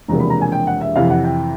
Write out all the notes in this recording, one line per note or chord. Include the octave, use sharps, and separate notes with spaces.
E1 E2 C3 F3 A#3 A#5
B5
A#5
G#5
G5
F#5
E5
F2 C3 E3 F5
F#5
G5